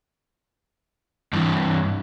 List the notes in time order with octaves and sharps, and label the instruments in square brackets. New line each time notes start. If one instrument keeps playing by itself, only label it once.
[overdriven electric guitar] G2 E3